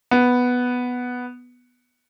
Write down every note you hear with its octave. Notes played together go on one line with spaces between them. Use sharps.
B3